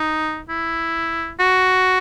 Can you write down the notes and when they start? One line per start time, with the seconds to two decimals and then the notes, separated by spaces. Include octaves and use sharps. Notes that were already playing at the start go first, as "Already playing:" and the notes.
Already playing: D#4
0.49 E4
1.40 F#4